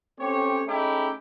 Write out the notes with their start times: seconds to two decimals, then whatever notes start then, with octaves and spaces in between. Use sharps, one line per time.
0.20 A3 C4 C#4 G4 C#5
0.67 G#3 A3 C#4 D#4 E4 G4